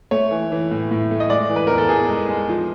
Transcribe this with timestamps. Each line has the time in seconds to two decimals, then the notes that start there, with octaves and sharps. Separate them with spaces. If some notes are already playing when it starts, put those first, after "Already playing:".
0.11 A3 C#5
0.31 E3
0.52 E3
0.71 A2
0.91 A2
1.11 A3
1.20 D#5
1.30 G#3 D5
1.49 E3
1.56 B4
1.67 E2 A#4
1.78 A4
1.89 E2 G#4
2.10 G#3
2.29 G#3
2.49 F3